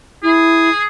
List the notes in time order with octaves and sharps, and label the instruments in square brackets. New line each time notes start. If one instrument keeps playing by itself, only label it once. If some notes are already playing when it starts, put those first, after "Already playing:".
[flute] E4 [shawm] G#4